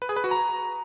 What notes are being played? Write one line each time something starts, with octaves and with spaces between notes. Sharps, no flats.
B4
G#4
B4
F#4
A#5